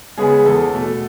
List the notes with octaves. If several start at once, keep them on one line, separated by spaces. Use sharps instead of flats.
C#3 G#3 B3 G#4
E2 A4
B2 A3